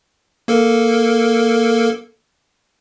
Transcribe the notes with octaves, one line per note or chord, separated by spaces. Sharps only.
A#3 A4 A#4